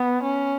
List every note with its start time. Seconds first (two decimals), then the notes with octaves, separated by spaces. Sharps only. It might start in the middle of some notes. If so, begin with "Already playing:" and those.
Already playing: B3
0.23 C#4